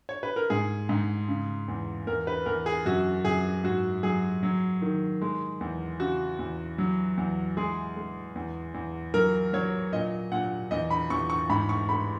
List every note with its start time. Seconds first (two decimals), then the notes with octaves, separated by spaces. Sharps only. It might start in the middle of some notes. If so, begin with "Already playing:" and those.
0.09 C#5
0.23 B4
0.36 A#4
0.50 G#2 G#4
0.89 G#2
1.29 C#3
1.68 E2
2.07 E2 A#4
2.27 B4
2.46 E2 A#4
2.66 G#4
2.86 F#2 F#4
3.25 F#2 G#4
3.64 G#2 F#4
4.03 F#3 G#4
4.43 F#3
4.82 D#3
5.21 G#3
5.61 E2
6.00 C#3 F#4
6.39 E2
6.78 F#3
7.17 E2
7.57 G#3 G#4
7.96 G#3
8.35 E2
8.74 E2
9.14 F#3 A#4
9.53 F#3 C#5
9.93 A#2 D#5
10.32 A#2 F#5
10.71 E2 D#5
10.90 B5
11.10 E2 C#6
11.30 C#6
11.50 G#2 B5
11.69 C#6
11.89 G#3 B5